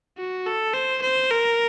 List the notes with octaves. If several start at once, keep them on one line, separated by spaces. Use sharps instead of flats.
F#4
A4
C5
C5
A#4